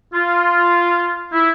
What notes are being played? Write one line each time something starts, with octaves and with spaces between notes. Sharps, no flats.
F4
E4